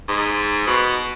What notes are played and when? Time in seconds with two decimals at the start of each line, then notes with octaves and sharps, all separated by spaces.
0.08 G#2
0.67 B2